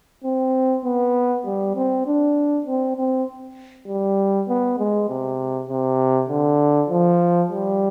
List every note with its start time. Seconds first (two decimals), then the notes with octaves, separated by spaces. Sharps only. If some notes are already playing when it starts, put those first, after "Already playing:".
0.24 C4
0.85 B3
1.45 G3
1.76 C4
2.07 D4
2.66 C4
2.97 C4
3.87 G3
4.48 B3
4.78 G#3
5.09 C3
5.69 C3
6.29 D3
6.90 F3
7.51 G3